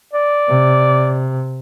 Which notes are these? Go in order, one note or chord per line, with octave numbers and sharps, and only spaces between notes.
D5
C3